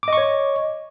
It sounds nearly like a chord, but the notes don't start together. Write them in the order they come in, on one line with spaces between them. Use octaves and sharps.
D6 D#5 C#6 C#5